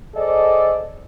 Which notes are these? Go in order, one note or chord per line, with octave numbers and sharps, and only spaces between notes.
G#4 A4 C5 D5 D#5